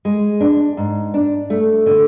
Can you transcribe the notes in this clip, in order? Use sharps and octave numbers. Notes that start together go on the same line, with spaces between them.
G#3
D4
G#2
D4
A3
D3